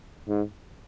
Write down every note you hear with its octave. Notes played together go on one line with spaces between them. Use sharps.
G#2